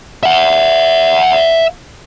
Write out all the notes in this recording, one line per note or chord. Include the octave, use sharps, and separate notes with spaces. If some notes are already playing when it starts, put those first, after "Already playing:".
E5 F#5